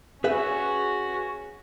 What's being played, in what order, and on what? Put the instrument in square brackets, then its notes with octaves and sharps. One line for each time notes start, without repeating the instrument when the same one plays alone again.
[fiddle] C#4 F#4 [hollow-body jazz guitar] G#4 B4 E5